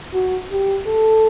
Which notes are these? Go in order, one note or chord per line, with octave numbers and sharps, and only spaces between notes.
F#4
G4
A4